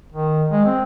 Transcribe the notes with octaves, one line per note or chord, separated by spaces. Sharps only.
D#3
G#3
C4